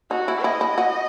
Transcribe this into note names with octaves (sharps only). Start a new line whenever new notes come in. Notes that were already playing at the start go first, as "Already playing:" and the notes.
D#4 F#4
E4
E4 D#5
E4
F#4